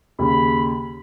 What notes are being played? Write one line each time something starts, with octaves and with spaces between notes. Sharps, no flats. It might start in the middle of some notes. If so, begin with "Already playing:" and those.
D#2 C#3 B5